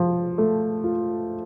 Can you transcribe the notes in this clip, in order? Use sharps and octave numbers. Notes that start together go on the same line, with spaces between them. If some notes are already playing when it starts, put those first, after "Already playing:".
Already playing: F3
A3
F4